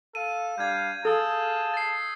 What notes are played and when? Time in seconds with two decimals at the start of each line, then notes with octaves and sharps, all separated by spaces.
0.15 A4 F5 D#7
0.58 G3 D4 F5 G6 G#6
1.05 G#4 A4 F5 A5 D#6 E6
1.74 A6 C7